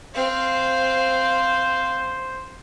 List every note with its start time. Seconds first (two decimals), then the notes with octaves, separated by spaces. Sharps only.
0.14 C4 C5 F5